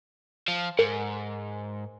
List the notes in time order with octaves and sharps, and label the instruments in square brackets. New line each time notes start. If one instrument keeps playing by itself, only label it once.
[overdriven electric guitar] F3
[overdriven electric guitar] G#2 [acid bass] A#4